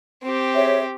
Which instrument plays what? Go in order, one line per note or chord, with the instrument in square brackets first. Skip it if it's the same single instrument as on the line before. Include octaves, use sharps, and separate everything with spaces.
[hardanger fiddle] C4 G4
[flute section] G#4 C#5 E5